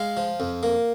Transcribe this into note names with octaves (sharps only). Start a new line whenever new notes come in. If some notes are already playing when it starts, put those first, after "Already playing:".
Already playing: G#3 F5
F3
F2
A#3